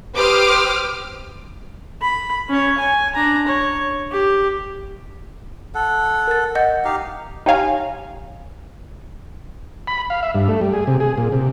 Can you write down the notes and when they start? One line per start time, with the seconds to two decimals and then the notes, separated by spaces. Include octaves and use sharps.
0.13 G4 B4 C5 D6 D#6 F6
2.01 B5
2.49 C#4 C#5
2.78 G#5
3.15 D4 A#5
3.47 C#5
4.12 G4
5.75 A4 F#5
6.27 A#4 A6
6.55 D#5 F#5 G6
6.85 D#4 G4 F5
7.46 D#4 G4 C#5 F5 G#5 A#5
9.87 B5
10.10 F5
10.23 E5
10.35 G2
10.48 A3
10.61 G3
10.73 G#4
10.87 C3
11.00 G#4
11.18 A#2
11.32 C3